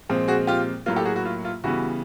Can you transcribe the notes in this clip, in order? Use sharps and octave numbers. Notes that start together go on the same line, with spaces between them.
A#2 F3 G#3 C4
F#4 G#4
F4 G4
A2 F#3 A#3 F4
G4 A4
F#4 G#4
F#4
F4
F4
C#3 E3 G3 B3 F#4